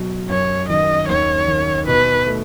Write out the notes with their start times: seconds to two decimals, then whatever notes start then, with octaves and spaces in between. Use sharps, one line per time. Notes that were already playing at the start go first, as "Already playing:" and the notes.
Already playing: B2 F#3
0.30 F#2 C#5
0.69 D#3 D#5
1.08 D#2 C#5
1.48 D#3
1.87 B2 B4
2.27 A3